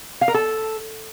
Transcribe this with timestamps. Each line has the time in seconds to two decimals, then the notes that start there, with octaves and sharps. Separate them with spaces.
0.21 F5
0.28 A#4
0.34 A4